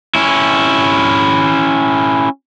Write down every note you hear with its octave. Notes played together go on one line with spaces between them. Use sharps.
C#4 E4